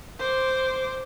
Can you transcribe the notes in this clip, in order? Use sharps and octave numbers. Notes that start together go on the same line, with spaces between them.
C5 D6